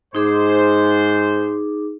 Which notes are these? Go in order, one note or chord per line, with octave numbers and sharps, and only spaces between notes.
G#2 D#4 G#4 C5 D6